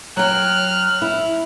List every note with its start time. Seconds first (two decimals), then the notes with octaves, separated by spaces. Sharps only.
0.17 F#3 G5 F6 F#6
1.02 E4